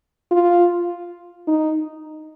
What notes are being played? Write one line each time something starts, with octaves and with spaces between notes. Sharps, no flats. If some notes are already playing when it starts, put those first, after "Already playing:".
F4
D#4